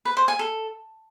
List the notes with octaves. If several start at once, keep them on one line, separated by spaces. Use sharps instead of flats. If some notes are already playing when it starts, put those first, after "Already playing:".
B4
C5
G#5
A4